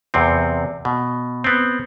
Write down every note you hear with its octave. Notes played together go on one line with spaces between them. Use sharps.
E2 C3 C4
B2
B3 C4